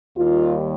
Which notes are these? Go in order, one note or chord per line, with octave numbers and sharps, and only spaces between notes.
D#2 D#3 G3 F4